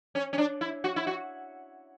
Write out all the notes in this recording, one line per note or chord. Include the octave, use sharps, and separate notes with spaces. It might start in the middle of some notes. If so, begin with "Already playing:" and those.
C#4
C#4
D4
E4
F#4
E4
F#4